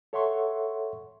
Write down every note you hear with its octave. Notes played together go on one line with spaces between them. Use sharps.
A4 C#5 E5 F#5 C6 C#6